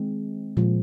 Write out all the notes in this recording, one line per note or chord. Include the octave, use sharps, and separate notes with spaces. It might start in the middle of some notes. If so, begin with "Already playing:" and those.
Already playing: D#3 G#3 C4
A#2 F3 G#3